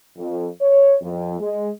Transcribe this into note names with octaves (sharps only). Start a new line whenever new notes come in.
F2
C#5
F2
G#3